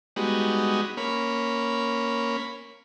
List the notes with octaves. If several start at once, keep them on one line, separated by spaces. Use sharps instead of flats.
G3 G#3 B3 D#4 F#4
A#3 C#4 B5